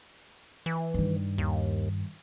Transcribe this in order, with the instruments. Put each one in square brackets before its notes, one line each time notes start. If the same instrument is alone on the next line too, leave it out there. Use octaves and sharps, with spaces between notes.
[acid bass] E3
[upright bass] G2 D#3
[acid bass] D#2